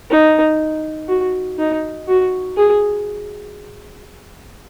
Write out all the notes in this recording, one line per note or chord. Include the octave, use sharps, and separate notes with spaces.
D#4
F#4
D#4
F#4
G#4